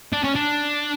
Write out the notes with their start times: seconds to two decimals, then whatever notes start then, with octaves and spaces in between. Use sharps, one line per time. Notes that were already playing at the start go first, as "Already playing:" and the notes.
0.13 D4
0.24 C#4
0.35 D4